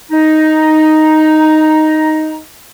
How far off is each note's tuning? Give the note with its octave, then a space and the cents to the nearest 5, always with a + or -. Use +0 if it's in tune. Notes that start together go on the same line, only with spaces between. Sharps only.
D#4 +0 A#5 +10